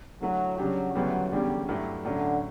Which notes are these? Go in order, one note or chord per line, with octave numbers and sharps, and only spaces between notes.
D3 F#3 A3 E4
C#3 F#3 G3 D4 G4
D2 C#3 F#3 G3 B3 E4
E2 D3 F#3 G3 C#4
G2 F#3 A3 E4 G4
A2 D3 F#3 C#4